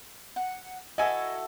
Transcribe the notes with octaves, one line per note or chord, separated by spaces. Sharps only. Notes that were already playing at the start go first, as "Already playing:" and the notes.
F#5
E4 F#4 A4 D#5 G#5